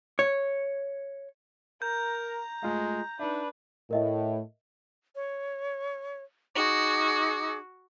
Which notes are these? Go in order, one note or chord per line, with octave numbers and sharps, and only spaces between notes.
C#5
A#4 A#5 G6
G#3 A3 F4 F5
D4 D#4 B4 E5
A2 A#4 D#5 E5
C#5
D#4 F#4 G#4 D6